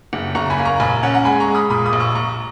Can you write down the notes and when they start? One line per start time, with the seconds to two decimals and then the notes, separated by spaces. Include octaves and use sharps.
0.13 F#1
0.35 F#1 A#5 C#6
0.50 G#5 B5
0.58 A#3
0.65 A#5 C#6
0.80 A#1 G#5 B5
1.03 C#4 F#5
1.14 F#5 A#5
1.25 G#3 G#5 B5
1.40 A#5 C#6
1.48 G#3
1.55 B5 D#6
1.70 A#2 B5 D#6
1.85 B5 D#6
1.93 A#1
2.00 C#6 E6
2.15 A#1 A#5 C#6